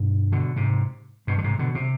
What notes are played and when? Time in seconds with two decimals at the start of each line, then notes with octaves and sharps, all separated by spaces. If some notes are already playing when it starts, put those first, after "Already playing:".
Already playing: G2 B2
0.32 B2 D3
0.56 G#2 C3
1.27 G2 B2
1.38 D3
1.44 G#2 C3
1.59 B2 D3
1.75 C3